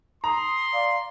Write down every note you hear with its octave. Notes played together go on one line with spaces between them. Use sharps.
A#5 C6 D#6
D5 F5